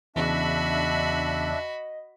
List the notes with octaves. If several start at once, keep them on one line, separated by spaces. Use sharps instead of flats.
E2 C#3 D4 F#4 D#5 E5 B5